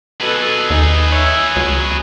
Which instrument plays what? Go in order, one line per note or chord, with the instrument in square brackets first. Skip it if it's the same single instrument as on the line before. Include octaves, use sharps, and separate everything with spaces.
[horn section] B2 A4 [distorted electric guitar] G#4 B4
[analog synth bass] D#2 [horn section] D#4
[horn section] C#5 E5
[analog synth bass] C#2 [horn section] F#3